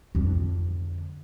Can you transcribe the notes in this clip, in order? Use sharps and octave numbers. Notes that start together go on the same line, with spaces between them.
F2 D3